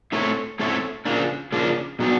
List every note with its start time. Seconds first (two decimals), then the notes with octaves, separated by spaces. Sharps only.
0.12 A3 C4 E4 A4 C#5
0.59 A3 C4 E4 A4 C#5
1.05 C#3 F3 A#3 D4
1.52 C#3 F3 A#3 D4
1.99 B2 F#3 B3 D4